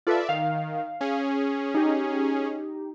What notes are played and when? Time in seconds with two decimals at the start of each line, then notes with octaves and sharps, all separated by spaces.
0.07 F4 A4 B4 D5 E5
0.29 D#3 F5
1.01 C#4 G#4
1.74 D#4 G4